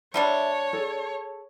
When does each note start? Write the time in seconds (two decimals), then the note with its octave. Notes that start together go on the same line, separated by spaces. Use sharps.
0.14 D3 G3 D4 C#5 E5
0.73 G#4 A4